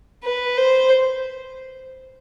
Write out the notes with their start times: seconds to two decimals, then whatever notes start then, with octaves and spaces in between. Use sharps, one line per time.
0.24 B4
0.57 C5